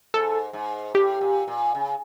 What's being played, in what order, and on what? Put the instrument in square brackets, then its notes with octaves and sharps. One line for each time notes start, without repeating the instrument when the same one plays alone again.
[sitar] G#2 [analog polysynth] A4
[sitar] G#2
[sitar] A2 [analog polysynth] G4
[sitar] A#2
A#2
C#3